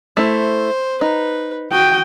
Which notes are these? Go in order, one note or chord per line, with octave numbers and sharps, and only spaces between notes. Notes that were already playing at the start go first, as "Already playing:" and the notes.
A3 E4 C5
D#4 B4
F#4 G5 D#6